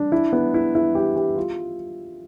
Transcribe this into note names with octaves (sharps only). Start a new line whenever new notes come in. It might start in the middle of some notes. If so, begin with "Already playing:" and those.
Already playing: D4
E4
B3
E4
E4
G4
G4
F4